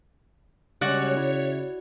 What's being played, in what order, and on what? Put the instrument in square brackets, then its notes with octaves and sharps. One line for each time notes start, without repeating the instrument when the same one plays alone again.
[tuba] C#3 [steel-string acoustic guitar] G3 G#3 [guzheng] F#4 D5 F#5 [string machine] C#5
[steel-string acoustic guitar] E4